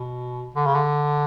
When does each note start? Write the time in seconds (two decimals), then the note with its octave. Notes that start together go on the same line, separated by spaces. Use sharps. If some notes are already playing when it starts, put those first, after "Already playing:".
Already playing: B2
0.55 D3
0.66 C#3
0.75 D3